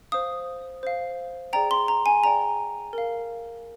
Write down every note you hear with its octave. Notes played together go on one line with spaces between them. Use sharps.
C5 F5 D#6
C5 F5
G#4 D5 G5 A#5
C6
A#5
G#5
G#4 D5 G5 A#5
A#4 F5